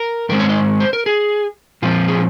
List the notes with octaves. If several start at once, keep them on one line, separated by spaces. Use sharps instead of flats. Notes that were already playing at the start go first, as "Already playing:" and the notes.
Already playing: A#4
G#2 D#3 G#3 C4 A#4
C#5
D#5
C5
A#4
G#4
A#2 F3 C4 F4
G#4